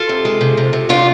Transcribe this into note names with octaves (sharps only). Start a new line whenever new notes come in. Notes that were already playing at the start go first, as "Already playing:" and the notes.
Already playing: F4 A4
C3
G#3
C3
C3
C3
A3 D4 F4